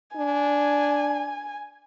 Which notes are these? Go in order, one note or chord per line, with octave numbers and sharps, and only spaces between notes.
D4 G#5